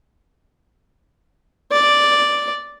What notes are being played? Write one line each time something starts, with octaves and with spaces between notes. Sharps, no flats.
D5